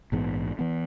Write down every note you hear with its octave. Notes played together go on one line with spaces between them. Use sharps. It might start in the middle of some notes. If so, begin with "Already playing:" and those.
A#1 G#2 E3 B3
E3 B3